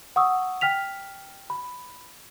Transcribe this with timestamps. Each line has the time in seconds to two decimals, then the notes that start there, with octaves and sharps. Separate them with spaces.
0.16 F#5 C#6 D#6 E6
0.61 G5 F6 B6 F7
1.50 B5